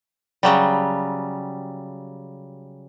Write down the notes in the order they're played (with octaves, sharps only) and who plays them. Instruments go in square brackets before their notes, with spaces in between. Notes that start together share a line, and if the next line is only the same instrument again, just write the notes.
[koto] C#3 F#3 G3